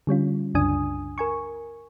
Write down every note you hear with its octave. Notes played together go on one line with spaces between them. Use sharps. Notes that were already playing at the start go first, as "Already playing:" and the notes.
D3 G3 C#4 F4
C2 F#2 C#3 D4 G#5 D#6
A#4 G#5 C#6